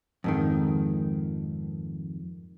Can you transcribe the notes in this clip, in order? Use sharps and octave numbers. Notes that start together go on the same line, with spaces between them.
F2 G#2 D#3